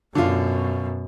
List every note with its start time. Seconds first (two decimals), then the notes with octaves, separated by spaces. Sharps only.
0.15 F#2 B2 D3 F4